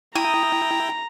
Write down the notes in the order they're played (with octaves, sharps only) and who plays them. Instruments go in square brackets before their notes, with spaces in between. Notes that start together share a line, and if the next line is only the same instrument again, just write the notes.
[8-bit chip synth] E4 G5 [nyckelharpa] A#5 [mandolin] D#6